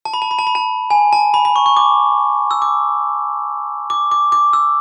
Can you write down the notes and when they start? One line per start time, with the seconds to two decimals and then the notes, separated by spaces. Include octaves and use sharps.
0.05 A5
0.14 B5
0.22 A5
0.31 B5
0.39 A5
0.47 B5
0.55 A5
0.90 G#5
1.13 A5
1.34 B5
1.45 B5
1.56 C#6
1.66 C#6
1.77 D6
2.51 E6
2.62 D6
3.90 D6
4.11 D6
4.32 D6
4.53 E6